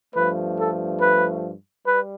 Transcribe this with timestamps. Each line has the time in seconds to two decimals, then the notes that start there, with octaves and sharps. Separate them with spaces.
0.15 G2 F3 A3 B4
0.58 A4
1.00 B4
1.86 G3 B4